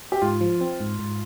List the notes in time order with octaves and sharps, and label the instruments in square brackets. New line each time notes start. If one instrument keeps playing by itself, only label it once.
[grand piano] G4
[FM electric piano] G#2 [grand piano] F4
[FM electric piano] F3
C4
G#2
G#2